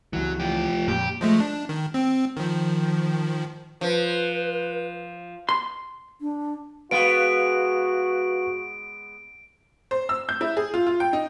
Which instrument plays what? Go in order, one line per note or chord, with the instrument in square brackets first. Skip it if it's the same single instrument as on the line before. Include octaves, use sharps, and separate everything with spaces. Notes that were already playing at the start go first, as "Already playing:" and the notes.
[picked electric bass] C#2 E3 [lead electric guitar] F#3
[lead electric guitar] F3 G4
[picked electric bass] F2 A#2 [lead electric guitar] G4
[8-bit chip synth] F3 G#3 A3
D4
D#3
C4
D#3 F3
[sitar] F3 [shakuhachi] B4
[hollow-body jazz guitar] C6
[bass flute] D4
[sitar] G#3 B3 [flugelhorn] F#4 [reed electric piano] B4 F5 [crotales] D7
[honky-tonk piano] C5
E6
G6
E4
G#4
F4
F4
G5
D#4